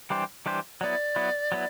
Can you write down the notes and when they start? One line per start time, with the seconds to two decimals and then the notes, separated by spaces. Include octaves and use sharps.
0.10 E3 G3 D4 G4 C5
0.46 E3 G3 D4 G4 C5
0.81 F#3 B3 E4 D5
1.16 F#3 B3 E4
1.52 F#3 B3 E4